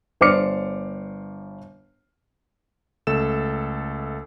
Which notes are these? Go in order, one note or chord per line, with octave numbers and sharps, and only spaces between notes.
G1 C5 D5 D6 F6 C#7
C#2 A3 A4 E6 E7